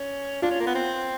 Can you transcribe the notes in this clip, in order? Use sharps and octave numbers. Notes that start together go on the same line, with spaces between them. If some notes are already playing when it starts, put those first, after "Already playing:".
Already playing: C#4
D4 F4
C#4
A#3
B3
C4